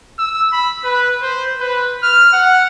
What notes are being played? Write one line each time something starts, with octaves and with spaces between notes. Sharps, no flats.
E6
B5
B4
C5
B4
F6
F#5